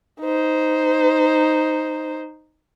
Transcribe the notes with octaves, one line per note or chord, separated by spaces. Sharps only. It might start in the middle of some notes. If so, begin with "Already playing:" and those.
D#4 C5